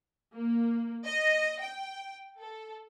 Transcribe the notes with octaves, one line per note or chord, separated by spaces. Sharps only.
A#3
D#5
G5
A4